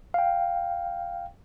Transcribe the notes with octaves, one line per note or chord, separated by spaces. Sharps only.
F5 G5